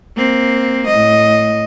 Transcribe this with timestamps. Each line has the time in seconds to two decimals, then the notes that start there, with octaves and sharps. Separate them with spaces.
0.17 A#3 C4
0.87 A2 D#5